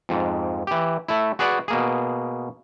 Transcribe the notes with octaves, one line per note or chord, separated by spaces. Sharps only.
F2 G#2
E3 G4
A3 E4
F#4 G#4 B4 D5 F#5 G#5
B2 A#3 G#4